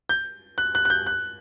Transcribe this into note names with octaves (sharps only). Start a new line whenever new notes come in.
G6
F#6
F#6
F#6
G6
F#6